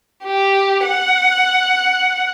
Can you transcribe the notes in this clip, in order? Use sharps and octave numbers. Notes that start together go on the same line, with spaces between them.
G4
F#5